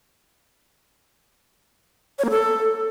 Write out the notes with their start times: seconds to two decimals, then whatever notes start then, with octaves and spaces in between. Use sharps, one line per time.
2.19 C#5
2.24 A#3
2.30 A4